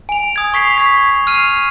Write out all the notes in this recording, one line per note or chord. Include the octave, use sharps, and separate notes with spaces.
G#5 F7
D#6 G#6
C#6 B6 C7 F7
C#6 G#6 B6
F6 C7 D#7 F7